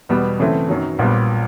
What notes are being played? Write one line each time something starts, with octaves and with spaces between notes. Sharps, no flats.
E2 B2 G3 B3
C#3 E3 A3 C4
F#2 D#3 F#3
A#1 A#2 G3 B3